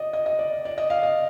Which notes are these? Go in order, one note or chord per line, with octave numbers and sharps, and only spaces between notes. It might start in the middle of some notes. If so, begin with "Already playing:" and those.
Already playing: D5 D#5
D#5
D#5
D5
D5
D#5
F5
D#5